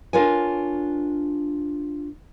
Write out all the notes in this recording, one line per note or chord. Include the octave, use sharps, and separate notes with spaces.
D4 F4 A#4 C#5 G#5